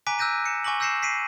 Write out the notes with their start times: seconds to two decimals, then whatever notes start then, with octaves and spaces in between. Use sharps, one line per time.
0.07 G#5 A#5 D6 F#6 B6 D7
0.19 E6 F#6 G6 A#6 D#7
0.46 C#7 E7
0.64 G#5 C#6 D6 A#6 F#7
0.80 E6 G6 A#6 C7 C#7 E7
1.02 B6 C7 D7 D#7